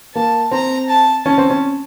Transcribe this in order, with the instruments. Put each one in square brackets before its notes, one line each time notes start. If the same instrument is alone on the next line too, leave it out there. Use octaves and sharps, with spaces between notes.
[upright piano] A#3 [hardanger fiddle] A5
[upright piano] C4 [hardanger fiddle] A#5
[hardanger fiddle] A5
[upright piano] C#4 [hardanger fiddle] A5
[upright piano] C4
C#4